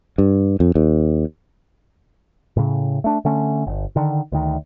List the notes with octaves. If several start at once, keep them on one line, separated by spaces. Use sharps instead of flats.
G2
F2
D#2
A2 C#3
A3 D4
D3 A3 C#4
G1
D3 D#3
D2 D#3